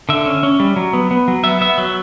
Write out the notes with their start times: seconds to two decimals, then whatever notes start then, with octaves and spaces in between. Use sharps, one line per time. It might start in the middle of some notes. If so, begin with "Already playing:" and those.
0.09 D3 E5
0.26 C#4
0.43 C#4
0.60 G3
0.76 F#3
0.93 B3
1.11 B3
1.28 F#3
1.44 B3 E5
1.61 B3 E5
1.78 F#3